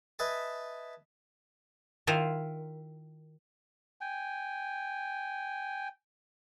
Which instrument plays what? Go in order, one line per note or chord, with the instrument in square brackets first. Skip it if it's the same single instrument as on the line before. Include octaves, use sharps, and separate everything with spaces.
[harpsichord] B4 D#5 E5 G#5 A5
[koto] D#3 E4 F4 A#4 C5
[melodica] G5 G#5